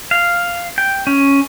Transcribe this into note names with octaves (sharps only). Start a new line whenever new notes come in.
F5
G5
C#4